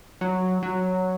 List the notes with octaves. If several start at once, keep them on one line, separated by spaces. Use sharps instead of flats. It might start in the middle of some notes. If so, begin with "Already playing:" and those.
F#3
F#3